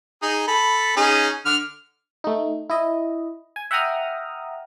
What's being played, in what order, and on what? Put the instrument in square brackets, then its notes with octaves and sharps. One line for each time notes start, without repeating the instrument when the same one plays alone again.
[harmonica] D#4 G#4
A4 B5
C#4 D#4 G#4
D3 F6
[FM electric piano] A3 D#4
E4 D#5
G#5
E5 F#5 G5 A#5 D#6 F6